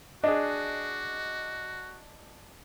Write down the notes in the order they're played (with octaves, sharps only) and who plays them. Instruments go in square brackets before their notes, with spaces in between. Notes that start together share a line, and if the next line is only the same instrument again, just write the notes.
[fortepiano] D4 G#4 [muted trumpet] F#4 [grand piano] D#5